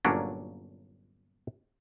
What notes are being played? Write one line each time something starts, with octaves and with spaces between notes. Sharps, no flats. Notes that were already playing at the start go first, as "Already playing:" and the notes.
G1 A#2 F#3 A#3 C#4 D4